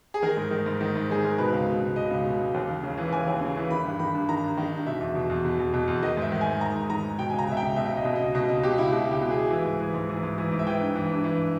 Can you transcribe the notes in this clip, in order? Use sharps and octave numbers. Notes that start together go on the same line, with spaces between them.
G#4
D#3 A#4
G#2
D#3
G#2
D#3
G#2
D#3 G#4
G#2 A#4
B2 B4
C#2
B2
C#2
B2 D#5
C#2
B2
C#2
D#2
D#2
C#3
E3
D#2 G#5
D#2
C#3
E3
D#3 B5
G2
D#3 B5
G2
D#3 A#5
G2
D#3
G2
B2 E5
E2
B2
E2
B2
E2
B2
E2
D#3 D#5
G#2 E5
D#3
G#5
G#2
D#3 A#5
G#2
D#3 A#5
G#2
B2 G5
G#5
C#2
A#5
B2 E5
G5
C#2
B2 E5
E5
C#2
D#5
B2
D#5
C#2
B2 D#5
C#2 D#5
B2 G4
C#2 E4
B2 G4
C#2 G4
B2
G#4
C#2
E3
G#2
E3
G#2
E3
G#2
E3
G#2
E5
E3 G5
G2
E3
G2
E3